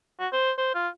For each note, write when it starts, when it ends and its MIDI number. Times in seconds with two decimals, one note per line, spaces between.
0.19 0.28 66
0.32 0.51 72
0.58 0.70 72
0.75 0.88 65